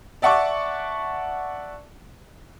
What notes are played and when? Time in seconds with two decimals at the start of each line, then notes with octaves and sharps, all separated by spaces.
0.22 D5 E5 F#5 A5 C#6 D6